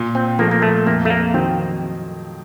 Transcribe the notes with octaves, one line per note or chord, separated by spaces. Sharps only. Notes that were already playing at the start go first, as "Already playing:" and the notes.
Already playing: A#2
C4
F3 A3 A#3
A#3
A3
F2 A#3
A3
A#3
D#3 F#3 C4